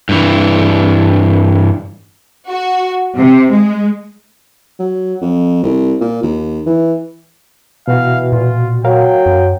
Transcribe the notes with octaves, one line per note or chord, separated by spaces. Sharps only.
G2 E3
F#4
C3
G#3
F#3
F2
C2
A#2
D#2
E3
B2 E3 F#4 F5
A#2 F4
F#3 A#4 F5 G5
F#2